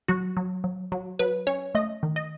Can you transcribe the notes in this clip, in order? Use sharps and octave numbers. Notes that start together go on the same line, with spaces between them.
F#3 F#4
F#3
F#3
F#3
F#3 B4
C#4 C#5
A3 D#5
D#3
D#5